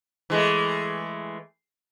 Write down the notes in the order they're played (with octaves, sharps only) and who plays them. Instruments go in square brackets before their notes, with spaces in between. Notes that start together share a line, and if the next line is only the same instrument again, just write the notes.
[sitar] E3 G#3 A3